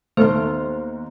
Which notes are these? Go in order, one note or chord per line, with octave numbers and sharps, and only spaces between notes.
D#2 A3 B3 D#4 C5 C6